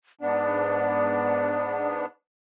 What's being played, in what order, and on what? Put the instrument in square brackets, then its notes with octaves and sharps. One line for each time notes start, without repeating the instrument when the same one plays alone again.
[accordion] G#2 B3 D4 [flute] D5